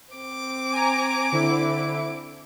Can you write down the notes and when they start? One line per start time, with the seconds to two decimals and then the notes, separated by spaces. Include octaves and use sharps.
0.14 C4 D6
0.72 G#5 A#5
1.32 D3 E4